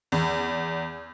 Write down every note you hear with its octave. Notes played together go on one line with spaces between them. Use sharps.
E2